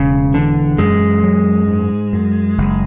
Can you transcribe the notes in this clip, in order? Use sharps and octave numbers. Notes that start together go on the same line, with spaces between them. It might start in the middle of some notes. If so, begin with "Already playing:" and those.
Already playing: E1 E2 C#3
D3 E3
F#2 G#3
F#3
G#2
F#2
F#1